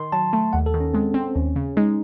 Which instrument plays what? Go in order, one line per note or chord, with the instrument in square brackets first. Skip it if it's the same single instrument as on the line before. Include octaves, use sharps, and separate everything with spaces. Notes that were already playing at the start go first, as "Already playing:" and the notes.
Already playing: [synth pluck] D#3 [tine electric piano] C6
[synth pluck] F#3 [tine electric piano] A5
[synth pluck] A3
[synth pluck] D#2 [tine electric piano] F#5
[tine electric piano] A4
[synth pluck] D#3
[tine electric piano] C#4
[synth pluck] G#3 [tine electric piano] C4
[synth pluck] C4
[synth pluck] D#2 [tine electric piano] C#4
[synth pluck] C#3
[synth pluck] G#3 [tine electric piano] D#4